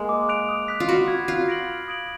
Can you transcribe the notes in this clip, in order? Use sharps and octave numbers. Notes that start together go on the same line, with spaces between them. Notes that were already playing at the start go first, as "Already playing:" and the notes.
Already playing: G#3 A#3
D6
F#6 D7 F7
D#6
F#6 B6
F4
F#4 B5
D6 G#6
F4 F#6
A#6 D7 F#7
B5
D#6 G#6 D7 F#7